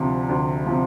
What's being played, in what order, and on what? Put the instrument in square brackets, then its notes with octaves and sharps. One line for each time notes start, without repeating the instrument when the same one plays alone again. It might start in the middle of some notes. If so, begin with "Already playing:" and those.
Already playing: [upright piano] D2 C3 F3
D2
C3 F3